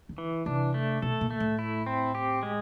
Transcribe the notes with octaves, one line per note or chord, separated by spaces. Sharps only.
D3
E3
C3 D4
A3
B2 A4
A#2
A3
A2
E4
C4
G4
G#3